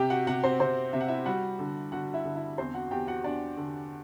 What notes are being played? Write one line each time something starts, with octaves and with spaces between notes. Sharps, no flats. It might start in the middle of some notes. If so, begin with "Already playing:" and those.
Already playing: C3 G4 G5
F#4 F#5
C3 F#4 F#5
C4 C5
C3 C4 C5
C3 E5
F#5
E4 E5
G3 F#4 F#5
D3
D3 F#4 F#5
E4 E5
D3
E4 E5
E2 C4 C5
F#4 F#5
E2 G4 G5
F#4 F#5
E2 D4 D5
D3